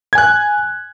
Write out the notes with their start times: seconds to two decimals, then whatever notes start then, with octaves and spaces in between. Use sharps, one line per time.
0.13 G#6
0.15 G#5
0.18 F#6